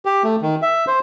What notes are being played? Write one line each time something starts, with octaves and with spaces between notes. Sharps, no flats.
G4
A3
D#3
E5
C5